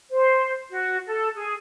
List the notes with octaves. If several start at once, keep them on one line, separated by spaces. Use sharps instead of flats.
C5
F#4
A4
G#4